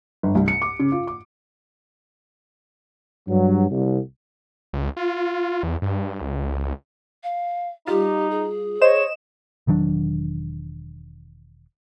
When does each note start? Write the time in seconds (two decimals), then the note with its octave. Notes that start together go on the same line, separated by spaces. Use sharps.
0.23 G1
0.35 C2
0.48 C#7
0.62 D6
0.80 C#3
0.92 F4
1.07 D6
3.28 G2 F#3
3.71 C2
4.73 C#2
4.97 F4
5.63 E2
5.82 G2
6.21 C#2
7.24 F5
7.87 G3 D#4 F4 G4
8.31 G#4
8.81 C5 C#5 D#5 E7
9.67 E1 D#3 F#3 D4